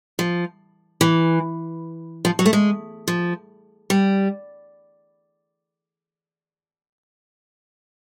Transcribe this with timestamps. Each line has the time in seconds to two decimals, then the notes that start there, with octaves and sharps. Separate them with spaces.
0.19 F3
1.01 E3
2.25 F3
2.39 F#3
2.46 A3
2.53 G#3
3.08 F3
3.90 G3